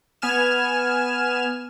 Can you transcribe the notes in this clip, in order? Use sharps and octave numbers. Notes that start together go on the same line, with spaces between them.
B3 G#5 F6 E7